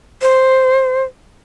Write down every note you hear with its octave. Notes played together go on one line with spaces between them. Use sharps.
C5